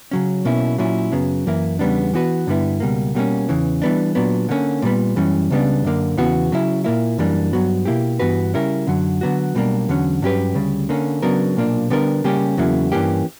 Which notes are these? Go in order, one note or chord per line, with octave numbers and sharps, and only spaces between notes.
C#3 F#3 C#4
B1 B2 A#3 C#4 E4
A#2 F#3 C#4 E4
F#2 C#3 F#3 B3
F#2 E3 A#3 E4
E2 C#3 G3 B3 D4
E3 B3 F#4 B4
G2 D3 G3 B3 E4
C#2 B2 G3 A#3
B2 G3 A#3 C#4
E2 C#3 E3
E3 G3 B3 D4
A#2 F#3 B3 D4
D3 A#3 C#4
A#2 G3 B3
F#2 E3 G3 C#4
C#2 C#3 G3 B3 D4
F#2 D3 A#3
E2 C#3 E3 B3 F#4
C#3 F#3 C#4 E4
A#2 A#3 E4
F#2 E3 G3 A#3 D4
G2 F#3 B3 F#4
B2 A#3 E4 G4
G2 E3 B3 F#4 B4
C#3 G3 C#4 E4 A#4
F#2 D3 F#3
D3 F#3 B3 F#4
B1 B2 G3 A#3 D4
E2 D3 F#3 C#4
G2 F#3 C#4 G4 B4
D2 C#3 G3
D3 A#3 C#4
C#3 F#3 B3 D4 A#4
B1 A#2 A#3 D4
D3 G3 B3 D4 A#4
C#3 G3 A#3 C#4 G4
E2 C#3 F#3 A#3 E4
G2 E3 A#3 C#4 G4